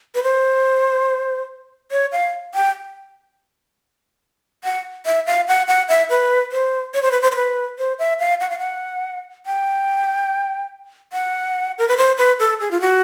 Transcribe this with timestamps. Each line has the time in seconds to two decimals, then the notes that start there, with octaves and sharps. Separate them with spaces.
0.15 B4
0.23 C5
1.91 C#5
2.12 F5
2.55 G5
4.64 F#5
5.06 E5
5.26 F5
5.48 F#5
5.68 F#5
5.89 E5
6.10 B4
6.52 C5
6.94 C#5
7.02 C5
7.11 B4
7.22 C5
7.32 C5
7.36 B4
7.79 C5
7.99 E5
8.20 F5
8.40 F#5
8.50 F5
8.59 F#5
9.46 G5
11.13 F#5
11.78 A#4
11.88 B4
11.97 C5
12.18 B4
12.39 A4
12.60 G#4
12.71 F4
12.81 F#4